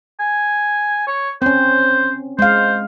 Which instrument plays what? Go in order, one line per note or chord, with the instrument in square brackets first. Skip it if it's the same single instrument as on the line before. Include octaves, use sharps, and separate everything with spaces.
[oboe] G#5
C#5
[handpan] C4 C#4 [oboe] C5
[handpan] G#3 F5 [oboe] C5